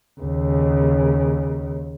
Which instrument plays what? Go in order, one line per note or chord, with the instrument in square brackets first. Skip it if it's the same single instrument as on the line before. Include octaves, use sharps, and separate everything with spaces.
[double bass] D#2 C#3